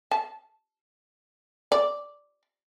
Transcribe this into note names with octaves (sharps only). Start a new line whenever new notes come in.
A5
D5